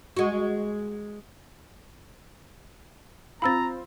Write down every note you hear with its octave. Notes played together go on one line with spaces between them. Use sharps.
G#3 F#4
C4 F4 A#5 B5 E6 A6